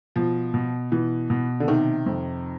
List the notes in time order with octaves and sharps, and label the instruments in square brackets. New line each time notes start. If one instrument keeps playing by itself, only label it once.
[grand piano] B2 [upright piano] F3
[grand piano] B2
[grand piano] B2 [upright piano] E3
[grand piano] B2
[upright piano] D3
[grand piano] C3 [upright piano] D#3
[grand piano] F2